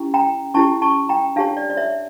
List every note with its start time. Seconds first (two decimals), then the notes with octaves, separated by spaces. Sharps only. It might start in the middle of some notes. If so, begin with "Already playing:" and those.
Already playing: C#4 E4 G4
0.14 G5 A#5
0.54 C#4 E4 G4 A5 C#6
0.82 A5 C#6
1.09 G5 A#5
1.36 D4 G4 C#5 F5 A5
1.57 D5
1.70 D5
1.77 C#5 E5